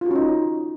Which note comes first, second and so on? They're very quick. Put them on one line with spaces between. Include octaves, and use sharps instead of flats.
F4 F#4 C#4 D#4